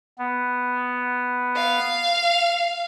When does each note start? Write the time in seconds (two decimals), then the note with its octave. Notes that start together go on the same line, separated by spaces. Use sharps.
0.19 B3
1.56 F5